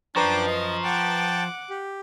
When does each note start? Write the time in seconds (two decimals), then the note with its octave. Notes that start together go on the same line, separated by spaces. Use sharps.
0.16 F#2 F3 D4 B4 G5 A#5 C#6 D6
0.47 D#5
0.84 F#5 G5 A5 D6
1.70 G4